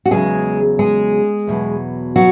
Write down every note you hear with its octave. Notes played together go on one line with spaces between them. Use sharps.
F#4
E2 C#3 F#3 G#3 G#4
G#3 G#4
E2 B2 F#3
F#3 F#4